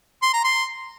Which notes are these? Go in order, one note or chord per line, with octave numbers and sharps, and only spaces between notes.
C6
A#5
C6